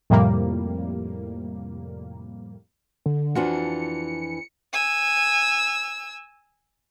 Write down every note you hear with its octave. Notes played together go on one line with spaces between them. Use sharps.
F2 A2 C3 G3 A#3
D3
F2 E3 D4 F4 F#4 C#7
G#5 E6